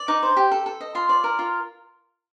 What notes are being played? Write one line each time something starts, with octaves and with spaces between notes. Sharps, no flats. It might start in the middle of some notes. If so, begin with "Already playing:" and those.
Already playing: D5
D#4 D6
C5
G4
A4
A4
D#5
F4 C6
D5
A#4
F4